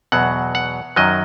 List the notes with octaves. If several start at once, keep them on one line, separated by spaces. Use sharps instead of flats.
E2 B2 F#3 F#5
F#5
F#2 D#3 F#3 D#5